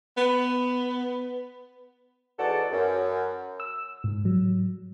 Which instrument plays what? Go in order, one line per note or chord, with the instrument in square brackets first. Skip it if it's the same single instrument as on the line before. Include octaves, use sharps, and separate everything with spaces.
[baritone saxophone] B3
[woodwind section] E2 G#2 F#4 A4 D5 F#5
F#2
[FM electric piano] E6
G#2
F#3